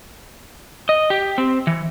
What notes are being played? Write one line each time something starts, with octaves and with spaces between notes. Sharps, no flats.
D#5
G4
C4
E3